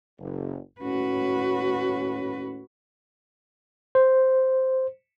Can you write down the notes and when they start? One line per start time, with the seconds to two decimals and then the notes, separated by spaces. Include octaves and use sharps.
0.18 F#1
0.81 D#2 A2 C#4 F#4 B4
3.95 C5